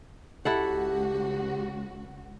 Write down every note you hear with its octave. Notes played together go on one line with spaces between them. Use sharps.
C#2 E4 F#4 G4 A4 F#5